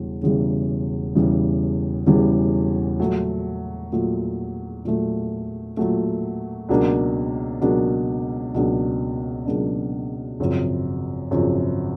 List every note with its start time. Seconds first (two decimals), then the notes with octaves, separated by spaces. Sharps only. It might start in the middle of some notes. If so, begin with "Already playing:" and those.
Already playing: E1 E2 C#3 E3 G3
0.22 E1 E2 C#3 E3 G3
1.15 E1 E2 C#3 E3 G3
2.07 E1 E2 C#3 E3 G3
2.99 A#2 F#3 A3
3.92 A#2 F#3 A3
4.85 A#2 F#3 A3
5.77 A#2 F#3 A3
6.69 C#2 B2 F#3 A#3 D4
7.61 C#2 B2 F#3 A#3 D4
8.54 C#2 B2 F#3 A#3 D4
9.46 C#2 B2 F#3 A#3 D4
10.40 G#1 F#2 C#3 F3
11.31 G#1 F#2 C#3 F3